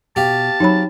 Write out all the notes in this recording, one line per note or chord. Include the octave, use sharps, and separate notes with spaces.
B2 G4 F5 A5
F#3 C4 D#4 C#5 B5